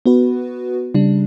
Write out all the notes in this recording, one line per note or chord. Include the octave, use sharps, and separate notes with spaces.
B3 F#4 B4
C#3 G3 D4